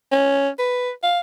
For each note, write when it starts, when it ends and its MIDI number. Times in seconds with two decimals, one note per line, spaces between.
0.12 0.49 61
0.59 0.91 71
1.03 1.20 77